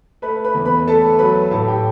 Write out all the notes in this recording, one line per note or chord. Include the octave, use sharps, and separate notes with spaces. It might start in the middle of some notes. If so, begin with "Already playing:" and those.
A3 B4 B5
B4 B5
E2
B4 B5
A3 A4 A5
F#3 B4 B5
A2 A4 A5
G4 G5